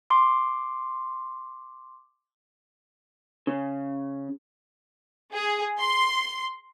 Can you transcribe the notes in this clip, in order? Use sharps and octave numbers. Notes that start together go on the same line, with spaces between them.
C6 D6
C#3
G#4
C6